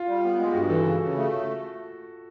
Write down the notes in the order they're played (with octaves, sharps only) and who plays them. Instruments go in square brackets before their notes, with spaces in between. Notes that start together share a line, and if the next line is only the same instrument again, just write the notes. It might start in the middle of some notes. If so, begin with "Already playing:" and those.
Already playing: [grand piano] F4
[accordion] G3
B3
G#3
[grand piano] G4
[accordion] G2 [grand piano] F#4
[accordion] E3 [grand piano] A4
[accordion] C#3
C#3
A3